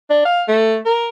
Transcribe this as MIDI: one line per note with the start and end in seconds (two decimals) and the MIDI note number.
0.10 0.25 62
0.25 0.43 77
0.48 0.77 57
0.85 1.09 70